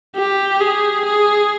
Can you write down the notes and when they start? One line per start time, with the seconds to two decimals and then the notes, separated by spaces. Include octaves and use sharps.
0.16 G4
0.60 G#4
1.05 G#4